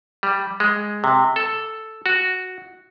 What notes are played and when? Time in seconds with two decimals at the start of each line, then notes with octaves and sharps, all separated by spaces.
0.23 G3
0.60 G#3
1.04 C3
1.36 A4
2.06 F#4